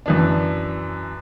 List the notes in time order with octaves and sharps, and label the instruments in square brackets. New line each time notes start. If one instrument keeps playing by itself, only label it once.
[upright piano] F#2 E3 D4